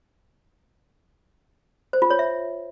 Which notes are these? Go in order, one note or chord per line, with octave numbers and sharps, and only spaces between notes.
C5
F4
C#5
E5